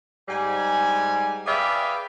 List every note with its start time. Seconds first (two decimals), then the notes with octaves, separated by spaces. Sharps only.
0.28 G#2 G3 G#5
1.46 G#4 B4 D5 E5 F5 G5